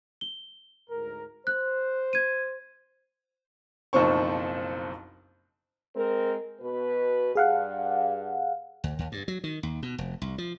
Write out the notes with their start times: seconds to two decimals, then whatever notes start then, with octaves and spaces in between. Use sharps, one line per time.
0.21 G7
0.90 D2 G#2 A#4
1.47 C5 F#6
2.13 G#6 D#7
3.93 F#1 B1 F3 C4 C5 C#6
5.96 G#3 C4 A#4
6.61 B2 B4
7.35 G2 G#4 F5 F#5
8.84 D2
8.99 D#2
9.12 G2
9.28 F#3
9.44 D#3
9.63 D#2
9.83 B2
9.98 F1
10.22 C2
10.38 F3